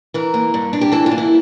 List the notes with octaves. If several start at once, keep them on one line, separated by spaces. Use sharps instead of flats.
E3 A#4
A#3
G2
D4
G4
E3 A4
F4
A#3
E4